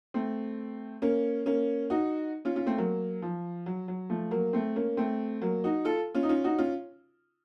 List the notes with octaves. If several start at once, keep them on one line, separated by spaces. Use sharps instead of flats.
A3 C4
A#3 C#4
A#3 C#4
D#4 F#4
C#4 F4
C#4 F4
A3 C4
F#3 A#3
F3
F#3
F#3
F3 A3
F#3 A#3
A3 C4
A#3 C#4
A3 C4
F#3 A#3
D#4 F#4
F4 A4
C#4 F4
D#4
C#4 F4
D#4 F#4
C#4 F4